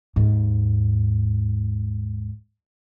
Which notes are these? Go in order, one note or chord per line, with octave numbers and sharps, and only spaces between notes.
D#2 G#2